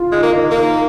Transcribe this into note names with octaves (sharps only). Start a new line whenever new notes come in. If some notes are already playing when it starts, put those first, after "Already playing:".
Already playing: F4
G#3 D#4
A#3
D#4
A#3